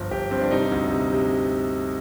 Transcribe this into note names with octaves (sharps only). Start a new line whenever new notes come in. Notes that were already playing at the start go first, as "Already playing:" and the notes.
Already playing: G1 F3 C5
G1 G4
G2 C4
D4
C3 D#4
D2
C3
C3